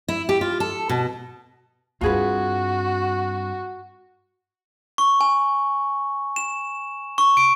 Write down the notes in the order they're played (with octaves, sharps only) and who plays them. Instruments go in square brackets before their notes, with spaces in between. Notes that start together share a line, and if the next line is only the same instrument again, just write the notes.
[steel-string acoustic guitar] E4
G4
F4
A4
B2
[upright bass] G2 C4 [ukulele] F4 G#4 B4 [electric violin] F#4
[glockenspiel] C#6
G#5
E7
C#6
D7